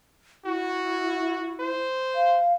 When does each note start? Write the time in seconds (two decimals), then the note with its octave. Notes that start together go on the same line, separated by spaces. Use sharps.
0.45 E4 F#4
1.60 C5
2.15 F5